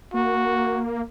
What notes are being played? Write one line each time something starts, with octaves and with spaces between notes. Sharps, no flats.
A#3 F#4